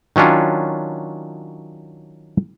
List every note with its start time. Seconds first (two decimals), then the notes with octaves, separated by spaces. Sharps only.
0.16 D#3 F#3 C#4 D4 F4